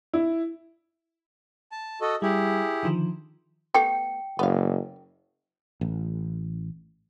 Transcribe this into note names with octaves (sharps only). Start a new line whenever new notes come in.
E4
A5
F#4 A4 D#5
G3 E4 G4 G#4
D3 D#3 F3
A3 B3 G4 G5 C#7
F#1 B3 F5
A1